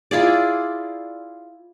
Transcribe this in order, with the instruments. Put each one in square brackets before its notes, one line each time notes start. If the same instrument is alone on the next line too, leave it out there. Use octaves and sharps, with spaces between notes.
[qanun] E4 F4 G#4 D5